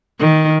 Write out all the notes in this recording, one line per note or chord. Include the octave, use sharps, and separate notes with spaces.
D#3